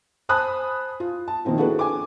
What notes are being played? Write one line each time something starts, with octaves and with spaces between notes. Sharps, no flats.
C5 G#5 A5 B5 D#6 F#6
F4
A5
D#3 F3 A#3 C4 E4
D4 E4 F#4 G#4 A4 B4
G#5 D6